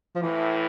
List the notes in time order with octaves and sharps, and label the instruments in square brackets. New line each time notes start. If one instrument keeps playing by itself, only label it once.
[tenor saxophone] F3
[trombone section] F2 A2 [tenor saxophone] E3